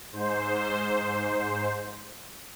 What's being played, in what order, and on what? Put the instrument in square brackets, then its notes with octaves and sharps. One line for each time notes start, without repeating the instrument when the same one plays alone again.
[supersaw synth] G#2 C5